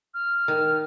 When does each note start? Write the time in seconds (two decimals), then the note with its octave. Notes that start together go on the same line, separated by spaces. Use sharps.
0.14 F6
0.48 D#3